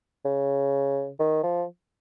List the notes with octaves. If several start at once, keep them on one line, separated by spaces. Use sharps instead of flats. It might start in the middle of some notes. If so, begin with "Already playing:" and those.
C#3
D#3
F3